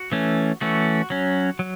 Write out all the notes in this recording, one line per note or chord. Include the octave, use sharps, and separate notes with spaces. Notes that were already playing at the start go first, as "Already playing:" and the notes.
Already playing: F#4
E3 A3 C#4
E3 A3 C#4 F#4
F#3 C#4
F#3